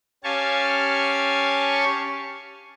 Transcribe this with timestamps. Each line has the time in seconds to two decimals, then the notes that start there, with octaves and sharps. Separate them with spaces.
0.24 C#4 G4 F5 G#5 A5 C#6